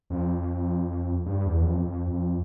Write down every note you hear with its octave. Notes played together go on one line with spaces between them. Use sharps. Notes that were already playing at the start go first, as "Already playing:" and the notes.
F2
G2
E2
F2
F2
F2